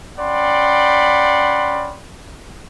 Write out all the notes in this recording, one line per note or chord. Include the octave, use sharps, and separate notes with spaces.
C#4 D5 F#5 G5 B5 C6